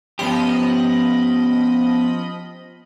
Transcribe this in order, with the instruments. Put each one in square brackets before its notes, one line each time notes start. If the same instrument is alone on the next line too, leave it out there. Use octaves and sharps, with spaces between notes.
[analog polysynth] F3 D#5 B5 [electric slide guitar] B3 C#4 G4